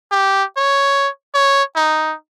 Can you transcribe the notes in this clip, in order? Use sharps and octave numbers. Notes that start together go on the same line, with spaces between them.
G4
C#5
C#5
D#4